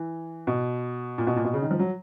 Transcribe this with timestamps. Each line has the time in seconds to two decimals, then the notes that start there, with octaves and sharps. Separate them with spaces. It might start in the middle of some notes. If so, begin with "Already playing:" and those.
Already playing: E3
0.47 B2
1.18 A#2
1.27 B2
1.36 A#2
1.44 B2
1.54 C#3
1.62 D#3
1.71 F3
1.79 F#3